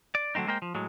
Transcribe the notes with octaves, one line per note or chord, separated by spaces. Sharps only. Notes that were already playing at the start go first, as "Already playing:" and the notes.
D5
D3 F#3 A3 C4 D#4
G#3 A#3 A#4 C5 G5
F3
A2 F#3 G#3